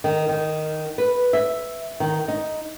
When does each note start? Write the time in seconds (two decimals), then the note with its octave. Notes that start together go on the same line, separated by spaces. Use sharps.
0.04 D#3
0.29 D#3
0.98 B4
1.33 E5
2.00 D#3
2.28 D#4